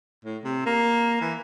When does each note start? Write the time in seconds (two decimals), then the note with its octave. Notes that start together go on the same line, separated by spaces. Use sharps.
0.25 A2
0.44 C3
0.66 A#3
1.21 E3